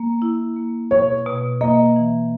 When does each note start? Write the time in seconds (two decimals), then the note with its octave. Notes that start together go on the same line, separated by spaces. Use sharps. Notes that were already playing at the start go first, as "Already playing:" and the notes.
Already playing: A#3
0.22 E4
0.56 A#3
0.91 B2 C#5
1.26 B2
1.61 A#3 D#5
1.96 E3